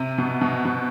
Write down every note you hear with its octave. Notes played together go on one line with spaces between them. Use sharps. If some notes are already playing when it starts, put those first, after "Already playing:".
Already playing: C3
B2
B2
B2